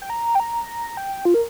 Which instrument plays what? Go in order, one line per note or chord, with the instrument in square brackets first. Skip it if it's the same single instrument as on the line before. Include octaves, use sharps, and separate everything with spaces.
[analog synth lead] G5
A#5
G5
A#5
G5
F4
A#4